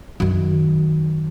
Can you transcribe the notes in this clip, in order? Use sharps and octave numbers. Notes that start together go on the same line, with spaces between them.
F#2 D#3